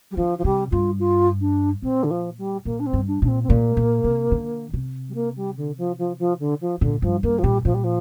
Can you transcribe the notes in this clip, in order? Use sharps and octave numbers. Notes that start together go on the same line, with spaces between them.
G3
D3 F3
F3
C3 G3
G2 F4
F4
D4
A#2 C4
D3
F3
G3
A#2 A#3
D4
C4
G2
D4
A#2 D4
C4
C4
A#2 A#3
A#2
C3
D3
C3
G3
A#3
G3
D3
F3
F3
F3
D3
F3
A#2 D3
G2 F3
G2 A#3
F3
A#2 G3
A#2 F3
G3
F3